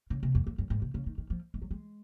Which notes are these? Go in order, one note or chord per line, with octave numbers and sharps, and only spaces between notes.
C#3
C3
F2
F2
F#2
G#2
C3
C#3
D#3
D#3
F3
G#3
F#3
G#3